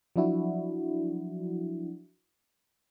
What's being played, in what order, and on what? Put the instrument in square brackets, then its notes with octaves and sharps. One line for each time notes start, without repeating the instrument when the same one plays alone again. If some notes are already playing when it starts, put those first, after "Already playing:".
[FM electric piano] F3 F#3 D4 E4 F#4